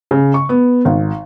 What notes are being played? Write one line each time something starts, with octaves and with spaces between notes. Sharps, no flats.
C#3
C#6
B3
G#1